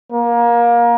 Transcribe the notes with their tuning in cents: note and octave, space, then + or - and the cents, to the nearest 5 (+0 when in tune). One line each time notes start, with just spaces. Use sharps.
A#3 +20